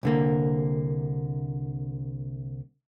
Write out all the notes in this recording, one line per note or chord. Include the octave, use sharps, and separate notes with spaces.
C2 D3 A#3